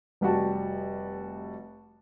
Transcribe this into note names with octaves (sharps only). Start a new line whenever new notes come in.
F1 G3 F#4 A5